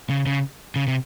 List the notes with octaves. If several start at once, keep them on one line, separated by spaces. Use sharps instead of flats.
C#3
C#3
C#3
C3